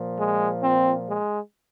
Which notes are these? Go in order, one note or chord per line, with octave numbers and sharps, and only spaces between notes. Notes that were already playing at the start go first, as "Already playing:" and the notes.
Already playing: A#2 F3
G#3
C4
G#3